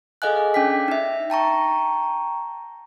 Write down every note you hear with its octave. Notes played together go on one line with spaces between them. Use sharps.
G#4 A4 D#5 F5 G#5 F#6
C#4 D4 G5 D6 B6
D#4 E5
G5 A5 A#5 C#6